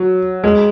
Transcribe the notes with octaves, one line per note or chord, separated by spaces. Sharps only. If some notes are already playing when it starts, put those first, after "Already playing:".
Already playing: F#3
G#3